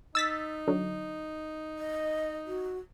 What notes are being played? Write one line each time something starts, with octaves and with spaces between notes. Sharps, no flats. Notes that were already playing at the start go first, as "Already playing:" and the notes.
D#4 E6 A6 B6
D3 F#3
D#5
F#4